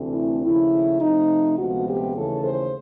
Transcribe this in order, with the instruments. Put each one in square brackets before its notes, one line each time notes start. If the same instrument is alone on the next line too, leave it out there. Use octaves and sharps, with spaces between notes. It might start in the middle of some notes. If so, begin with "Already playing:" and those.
Already playing: [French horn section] D2 C3 E3 A3 C4
E4
D#2 C#3 F3 A3 E4
C3 F3 A3 D#4
D2 C3 F3 G#3 B3 F#4
G4
D#2 C#3 E3 A3 A4
C5